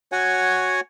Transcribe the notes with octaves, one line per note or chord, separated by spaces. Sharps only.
F#4 C#5 F#5 G#5